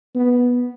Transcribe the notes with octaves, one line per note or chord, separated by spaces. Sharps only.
B3